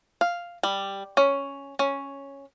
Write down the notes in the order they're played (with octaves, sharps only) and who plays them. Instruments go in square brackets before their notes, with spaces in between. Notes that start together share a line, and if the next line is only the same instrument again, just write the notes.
[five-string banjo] F5
G3
C#4
C#4